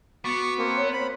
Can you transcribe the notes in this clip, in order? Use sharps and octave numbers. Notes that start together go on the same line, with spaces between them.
B3 F#4 C#6 D6
A#3 C4
C#5
C5 B5